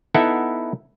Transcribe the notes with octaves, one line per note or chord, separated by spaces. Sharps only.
B3 D#4 E4 A4 E5 F#5